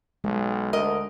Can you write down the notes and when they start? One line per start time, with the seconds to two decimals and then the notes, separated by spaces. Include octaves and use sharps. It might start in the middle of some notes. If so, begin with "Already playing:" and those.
0.24 B1 G#3
0.73 D2 A#4 D#5